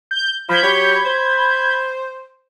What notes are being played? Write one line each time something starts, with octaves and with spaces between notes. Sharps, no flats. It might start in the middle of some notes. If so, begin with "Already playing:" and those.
G6
F3 B5 G6 G#6
F#3 G4 C#5
C5